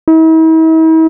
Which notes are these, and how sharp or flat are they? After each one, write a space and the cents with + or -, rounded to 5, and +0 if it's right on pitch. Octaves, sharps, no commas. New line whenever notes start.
E4 -45